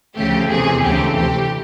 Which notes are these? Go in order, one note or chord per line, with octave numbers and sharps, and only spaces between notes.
D2 C#3 F3 A3 G4
E2 C3 E3 G#4
D2 C#3 E3 A3 C4 G4
D2 C3 E3 G4